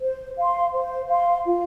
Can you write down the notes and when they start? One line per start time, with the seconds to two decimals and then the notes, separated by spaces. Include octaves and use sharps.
0.01 C5
0.37 F5 C6
0.73 C5
1.09 F5 C6
1.44 F4